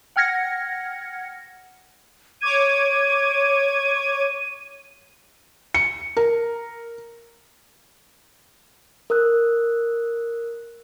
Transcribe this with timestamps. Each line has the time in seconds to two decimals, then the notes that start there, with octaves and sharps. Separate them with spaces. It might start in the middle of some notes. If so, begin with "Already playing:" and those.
0.16 F#5 G5 F6 G#6 A#6 C#7
2.41 C#5 D6 G#6 D#7
5.74 C#7
6.17 A#4
9.10 A#4 D#6 E6 F#6